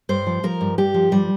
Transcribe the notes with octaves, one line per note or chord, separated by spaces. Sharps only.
G2 C5
F3
F3 A#4
G2
G2 G4
F3
G2 G3